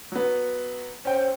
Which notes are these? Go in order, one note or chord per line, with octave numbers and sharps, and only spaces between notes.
F#3 B3
C#4 C5 G5